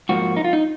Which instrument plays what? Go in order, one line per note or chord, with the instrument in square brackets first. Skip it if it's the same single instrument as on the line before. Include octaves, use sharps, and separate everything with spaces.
[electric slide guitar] G#2 F3 A#3 F#4
D#4
F4
D#4